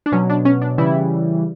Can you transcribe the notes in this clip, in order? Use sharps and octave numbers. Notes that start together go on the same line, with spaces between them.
D4
B2 F#3 C#4
D4
C#4
D4
C#3 E3 G3 E4